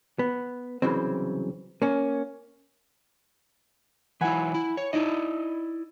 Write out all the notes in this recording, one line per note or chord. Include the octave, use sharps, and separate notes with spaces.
B3
C2 C#3 E3 F#3 C4
A#3 C#4
E3 F#3 E4 F#5 G#5 B5
E4
C#5
D#4 E4 D5 D#5